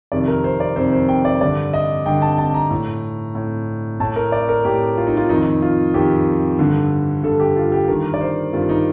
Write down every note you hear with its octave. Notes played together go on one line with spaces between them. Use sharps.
F2 C3 D#3 D5
A#4
C5
D5
F2 C3 D#3 C5
C5
G5
D5
G2 D3 D5
D#5
G2 D3 G5
A5
A5
A#5
A2
A2
A2 A5
A#4
D5
A#4
A2 G4
F4
D#4
F4
F2 D#3 D#4
F4
F2 D#3 G4
G2 D3
G2 D3 A4
G4
F4
G4
G2 D#3 A#4
D5
C5
G2 D#3 F4
D#4